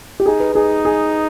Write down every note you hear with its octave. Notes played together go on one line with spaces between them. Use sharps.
G4
D#4 G#4
B4
D#4 G#4
G#4